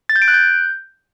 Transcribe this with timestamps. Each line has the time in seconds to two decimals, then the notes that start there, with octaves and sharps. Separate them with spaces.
0.09 A6
0.16 G6
0.22 D7
0.28 F#6
0.34 G6